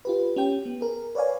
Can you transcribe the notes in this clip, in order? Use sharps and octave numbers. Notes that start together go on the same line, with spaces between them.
F4 G4 B4
C#4 G4 G5
B3
G#4 A#4
B4 C#5 D5 F5 G#5